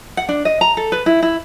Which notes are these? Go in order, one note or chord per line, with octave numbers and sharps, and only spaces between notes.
F#5
D4
D#5
A#5
A4
B4
E4
E4